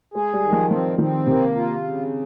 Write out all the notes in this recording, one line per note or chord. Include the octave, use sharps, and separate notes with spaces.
G#3 G#4
G3
D#3
F3
F3 C4
D#3 C4
C3 A#3
F4
C#3